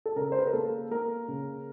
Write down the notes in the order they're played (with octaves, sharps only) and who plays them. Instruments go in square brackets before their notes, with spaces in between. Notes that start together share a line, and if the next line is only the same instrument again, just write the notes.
[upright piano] A4
C#3 A#4
C5
B4
A#4
A#3 A4
A#3 A#4
C#3